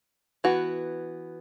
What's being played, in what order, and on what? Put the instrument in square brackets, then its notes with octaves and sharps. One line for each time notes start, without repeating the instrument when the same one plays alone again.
[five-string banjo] E3 B3 F#4